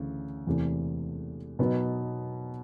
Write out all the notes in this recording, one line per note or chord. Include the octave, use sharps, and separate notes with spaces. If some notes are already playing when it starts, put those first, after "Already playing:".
Already playing: D2 C#3 E3
E1 E2 C3 E3 A3
B2 F#3 B3 D#4